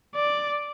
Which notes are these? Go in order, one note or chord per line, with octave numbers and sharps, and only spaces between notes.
D5